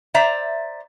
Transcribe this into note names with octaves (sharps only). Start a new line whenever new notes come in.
C5 D5 E5 A#5